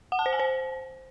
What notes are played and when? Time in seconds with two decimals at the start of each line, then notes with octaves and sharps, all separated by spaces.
0.12 F#5
0.19 A5
0.26 C5
0.33 G#5
0.40 C5